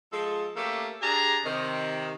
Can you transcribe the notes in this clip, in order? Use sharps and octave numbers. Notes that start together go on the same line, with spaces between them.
F3 G#3 A4
A3 A#3 C#4 G4 A4
D4 G4 G#4 A5 A#5
C3 D#3